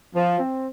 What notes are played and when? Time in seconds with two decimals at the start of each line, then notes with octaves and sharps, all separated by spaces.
0.15 F3
0.39 C4